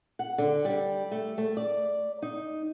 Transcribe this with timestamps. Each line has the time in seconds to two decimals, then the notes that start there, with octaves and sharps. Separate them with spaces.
0.19 F#5
0.38 D3
0.65 G3
1.11 A3
1.38 A3
1.57 D5
2.22 D#4